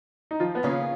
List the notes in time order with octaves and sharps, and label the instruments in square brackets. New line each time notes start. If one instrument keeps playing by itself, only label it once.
[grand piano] D#4
F3 F4
B3
[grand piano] C#3 C#4 [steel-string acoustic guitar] F3 A#3 F4 G#4 B4